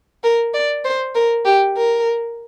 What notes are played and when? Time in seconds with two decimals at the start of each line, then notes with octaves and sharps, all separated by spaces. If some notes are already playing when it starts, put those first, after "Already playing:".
0.24 A#4
0.54 D5
0.85 C5
1.15 A#4
1.45 G4
1.77 A#4